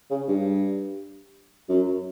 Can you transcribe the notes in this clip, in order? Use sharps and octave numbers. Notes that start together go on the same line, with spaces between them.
C#3
G2
F#2